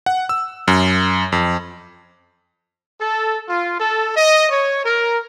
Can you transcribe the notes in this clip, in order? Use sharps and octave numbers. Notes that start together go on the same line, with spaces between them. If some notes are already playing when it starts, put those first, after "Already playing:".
F#5
E6
F#2
F2
A4
F4
A4
D#5
C#5
A#4